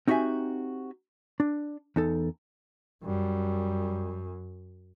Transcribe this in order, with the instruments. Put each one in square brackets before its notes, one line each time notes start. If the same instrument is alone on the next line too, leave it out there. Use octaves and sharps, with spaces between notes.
[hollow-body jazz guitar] C4 D#4 F#4 G4 E5 G#5
D4
E2 D#4 A4
[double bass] F#2 [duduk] G3